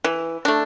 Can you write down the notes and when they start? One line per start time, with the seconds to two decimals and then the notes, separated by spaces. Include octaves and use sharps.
0.04 E3
0.45 A3 D4